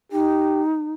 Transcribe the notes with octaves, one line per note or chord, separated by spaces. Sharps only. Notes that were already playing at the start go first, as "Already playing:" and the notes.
D#4 G4